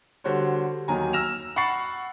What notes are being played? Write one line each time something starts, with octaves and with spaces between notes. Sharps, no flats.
D3 G3 F#4 C5 C#5
D#2 D#3 F#3 G#5 A#5
E6 F6 A#6 E7 F7
F#5 B5 C#6 A6 C7 F#7